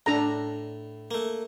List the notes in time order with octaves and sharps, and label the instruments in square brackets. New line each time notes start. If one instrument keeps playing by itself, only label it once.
[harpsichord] A2 [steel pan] D4 A4 A#5
[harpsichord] A3 A#3